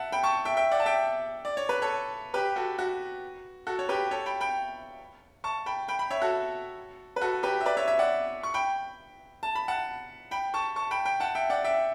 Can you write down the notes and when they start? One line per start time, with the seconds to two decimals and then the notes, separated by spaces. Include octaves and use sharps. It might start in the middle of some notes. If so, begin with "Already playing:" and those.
Already playing: E5 F#5 A5
0.12 G5 B5
0.24 A5 C#6
0.45 E5 G5
0.57 E5 G5
0.71 D5 F#5
0.80 A5
0.86 E5 G5
1.45 D5
1.57 C#5
1.69 B4
1.82 A4 C#5
2.34 G4 B4
2.56 F#4 A4
2.78 F#4
3.67 F#4 A4
3.79 C#5
3.89 G4 B4
4.11 A4 C#5
4.26 G5 B5
4.41 G5 B5
5.44 A5 C#6
5.66 G5 B5
5.88 G5 B5
5.99 G5 B5
6.10 C#5 E5
6.22 F#4 A4
7.16 B4
7.21 F#4 A4
7.43 G4 B4
7.61 E5
7.66 B4 D5
7.77 C#5 E5
7.87 C#5 E5
7.99 D5 F#5
8.43 C#6
8.54 G5 B5
9.43 A5
9.55 B5
9.68 F#5 A5
10.31 G5 B5
10.54 A5 C#6
10.76 A5 C#6
10.91 G5 B5
11.05 G5 B5
11.20 F#5 A5
11.35 E5 G5
11.50 D5 F#5
11.64 E5 G5